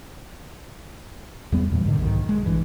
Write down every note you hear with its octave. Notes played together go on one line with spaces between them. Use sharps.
E2 G3 B3
E2 A#2 E3
G#2 B2 D3 D#3
B1 G#2 D#3
G#3
A#1 G2 E3